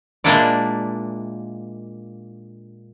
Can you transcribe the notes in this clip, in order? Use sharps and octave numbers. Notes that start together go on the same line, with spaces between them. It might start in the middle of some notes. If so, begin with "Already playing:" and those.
A#2 G#3 A#3 D4 E4 D5